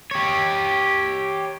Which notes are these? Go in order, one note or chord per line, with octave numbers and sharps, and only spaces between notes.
G4 C#5